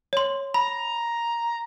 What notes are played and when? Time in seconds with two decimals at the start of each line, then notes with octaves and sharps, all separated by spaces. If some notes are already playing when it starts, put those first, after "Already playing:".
0.13 C#5 C6
0.54 A#5 B5